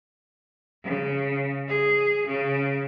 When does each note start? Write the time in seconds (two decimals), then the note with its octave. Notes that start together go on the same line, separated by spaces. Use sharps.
0.84 C#3
1.68 G#4
2.27 C#3